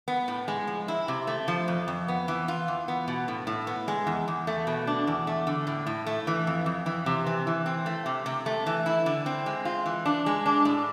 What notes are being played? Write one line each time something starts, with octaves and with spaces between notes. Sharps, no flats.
B3
A2
G#3
F3
E4
C3
A3
F3
F2
F2
B3
E3
F4
E2
B3
B2
A2
A2
B3
G#3
E2
E2
A3
B2
D4
E2
A3
D3
A2
A2
A3
E3
F2
F2
E3
C3
E3
E3
C4
A3
C3
C3
A3
E3
E4
D3
C4
G#3
F4
E3
D4
G#3
D4
A2